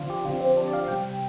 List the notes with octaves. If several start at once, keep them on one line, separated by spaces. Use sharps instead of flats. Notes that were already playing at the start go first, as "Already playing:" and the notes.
Already playing: D3 F3 C4 D4 F4
G4
D3 F3 C4 F4
C4
D4
D5
F5
C3 G3 C4 G5